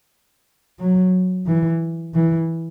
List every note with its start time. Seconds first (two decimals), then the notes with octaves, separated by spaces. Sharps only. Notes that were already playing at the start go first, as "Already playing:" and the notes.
0.80 F#3
1.47 E3
2.14 E3